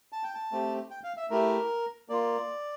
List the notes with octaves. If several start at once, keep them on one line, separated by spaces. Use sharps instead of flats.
A5
G5
A5
A3 C4 G4
G5
F5
E5
A3 E4 G4 A#4
A#3 F4 D5